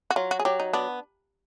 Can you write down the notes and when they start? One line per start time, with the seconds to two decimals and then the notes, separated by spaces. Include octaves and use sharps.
0.11 F#4
0.16 F#3 F4
0.31 F#4
0.40 G#4
0.45 F#3 G4
0.60 D#4
0.73 B3 D4